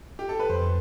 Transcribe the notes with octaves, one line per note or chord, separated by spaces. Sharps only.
G4
A4
B4
F2 C5